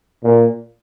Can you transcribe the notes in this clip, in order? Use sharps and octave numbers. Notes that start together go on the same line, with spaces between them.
A#2